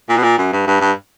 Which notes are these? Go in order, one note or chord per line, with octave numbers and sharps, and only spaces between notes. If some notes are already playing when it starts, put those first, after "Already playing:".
A#2
B2
A#2
F#2
G2
G2
G2